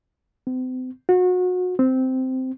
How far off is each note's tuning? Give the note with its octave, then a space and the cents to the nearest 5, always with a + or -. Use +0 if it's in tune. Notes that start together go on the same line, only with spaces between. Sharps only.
C4 -40
F#4 -30
C4 -10